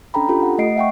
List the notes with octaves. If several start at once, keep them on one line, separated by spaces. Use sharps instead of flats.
C#4 D4 A4 G5 A#5 B5
F4 G4 A4
F#5
A3 D#5 C7 D7
E5 F#5 G5 C#6